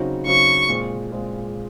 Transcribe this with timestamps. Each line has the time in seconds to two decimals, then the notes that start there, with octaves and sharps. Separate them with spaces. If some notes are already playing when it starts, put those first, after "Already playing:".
Already playing: C#3 F#3 C4 D#4 F#4
0.27 C#3 F#3 C4 D#4 F#4 C#6
0.69 A#2 G#3 C4
1.12 A#2 G#3 C4